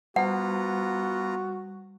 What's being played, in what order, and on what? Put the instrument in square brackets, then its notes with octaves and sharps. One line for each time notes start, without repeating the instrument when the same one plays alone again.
[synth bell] G3 [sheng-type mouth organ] B3 F4 A#5 [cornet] F#4 [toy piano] F#5